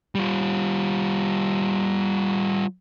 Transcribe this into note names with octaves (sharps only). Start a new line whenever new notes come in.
G3 F4